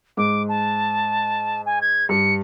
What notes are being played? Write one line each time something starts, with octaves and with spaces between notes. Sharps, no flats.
G#2 D6
A5
G#5
G#6
G2 C#7